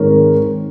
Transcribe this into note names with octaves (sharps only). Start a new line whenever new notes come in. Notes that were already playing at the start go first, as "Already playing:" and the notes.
Already playing: G#2 D#3 G#3 C4 D#4 A#4 C#5